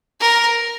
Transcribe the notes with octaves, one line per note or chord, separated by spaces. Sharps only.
A#4